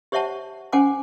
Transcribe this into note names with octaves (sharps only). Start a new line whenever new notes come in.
G4 C5 C#5 E5 F#5 A5
C#4 C5 F#5 G#5 D6